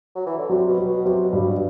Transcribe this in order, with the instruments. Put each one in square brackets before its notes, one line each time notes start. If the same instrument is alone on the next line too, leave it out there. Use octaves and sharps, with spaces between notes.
[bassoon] F#3
E3
D3
[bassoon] C3 [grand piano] F#3
[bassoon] B2
[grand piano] F#3
[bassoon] B2
[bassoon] C3 [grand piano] F#3
[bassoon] B2
[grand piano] G2
[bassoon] B2